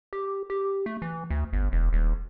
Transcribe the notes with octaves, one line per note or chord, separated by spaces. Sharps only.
G4
G4
A3
E3
D2
G1
E1
D#1